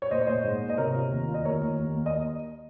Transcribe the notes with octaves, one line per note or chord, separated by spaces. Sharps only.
C#5
A#2 C5 D#5
C#5
A#2 C5 D#5
G#2
A#3
D#5
C3 A#4 C#5
F4
D#2
F4
D#5
D#2 A#4 C#5
D#2
D#2
A#3
D#5